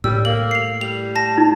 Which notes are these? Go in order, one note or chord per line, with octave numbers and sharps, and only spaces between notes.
A2 G3 E6
A#3 F#7
C7 F7
G3 F7
A5 A#6
D#4